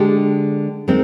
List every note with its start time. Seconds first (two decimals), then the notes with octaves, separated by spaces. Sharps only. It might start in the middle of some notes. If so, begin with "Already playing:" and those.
Already playing: D3 G#3 D4 G4
0.88 D#3 G#3 C4